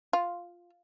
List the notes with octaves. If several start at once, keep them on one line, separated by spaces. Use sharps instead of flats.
F4